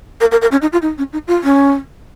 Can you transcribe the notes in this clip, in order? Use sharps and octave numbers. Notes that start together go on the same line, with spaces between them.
A#4
A#4
A#4
C#4
D#4
F4
D#4
C#4
D#4
F4
C#4